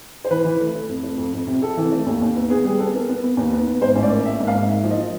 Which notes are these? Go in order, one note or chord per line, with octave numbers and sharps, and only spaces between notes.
C5
E3 B4
E3
A3
A3
F2
A3
F2
F2
C3
C3 A4
E3
A3
D#2
D#2
B3
B3 G#4
G3 G#4
B3 A4
B3 A#4
B3
B3
D#2
B3
B3
G#2 C5
A1
D5
A#3
A#3 E5
G#2
F5
G#2
A#3 E5
F3
D#5
F3